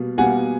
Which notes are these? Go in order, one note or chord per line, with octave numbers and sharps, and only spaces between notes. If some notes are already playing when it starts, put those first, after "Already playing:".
Already playing: B2 G3 A#3
B2 G3 A#3 F#5 G#5